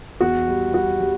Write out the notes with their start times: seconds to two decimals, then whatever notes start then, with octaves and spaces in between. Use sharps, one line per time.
0.20 E2 F#4
0.48 G3
0.73 G3 F#4
1.00 G3